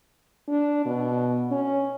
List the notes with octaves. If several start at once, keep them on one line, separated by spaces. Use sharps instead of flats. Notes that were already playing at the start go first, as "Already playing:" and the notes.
D4
B2
C#4